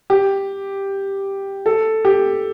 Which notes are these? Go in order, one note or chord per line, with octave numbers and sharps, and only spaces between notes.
G4
A4
G4